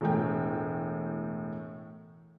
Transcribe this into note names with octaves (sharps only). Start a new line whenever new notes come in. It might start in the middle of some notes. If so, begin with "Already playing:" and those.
E1 A2 G5